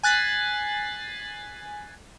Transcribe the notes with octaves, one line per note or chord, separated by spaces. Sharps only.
G#5 F#6 A6 B6 C7